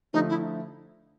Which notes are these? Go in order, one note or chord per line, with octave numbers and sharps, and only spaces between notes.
D3 F3 A3 D#4
E4